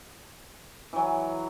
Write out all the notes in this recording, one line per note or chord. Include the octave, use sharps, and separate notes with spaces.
E3 F#3